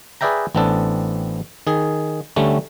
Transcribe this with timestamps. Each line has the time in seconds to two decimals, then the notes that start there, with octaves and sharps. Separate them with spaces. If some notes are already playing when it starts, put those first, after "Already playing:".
0.21 G#4 B4 D5 E5 G5 A#5
0.55 A1 B3 C4 D4 A4
1.67 D#3 G#4
2.36 D3 G3 A3 C#4